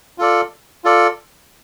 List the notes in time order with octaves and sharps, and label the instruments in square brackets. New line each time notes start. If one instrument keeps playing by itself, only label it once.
[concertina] F4 A4 D5
F4 A4 D5